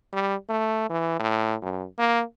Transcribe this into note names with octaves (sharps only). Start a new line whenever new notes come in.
G3
A3
E3
A2
F#2
A#3